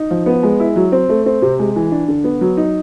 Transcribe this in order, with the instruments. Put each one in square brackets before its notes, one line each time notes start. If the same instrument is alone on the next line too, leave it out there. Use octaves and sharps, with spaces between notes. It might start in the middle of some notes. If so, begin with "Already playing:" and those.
Already playing: [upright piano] D#4
F3
B3
G#3
E4
F#3
C4
A3
C4
C3
G#3
E3
D4
D3
B3
F#3
D#4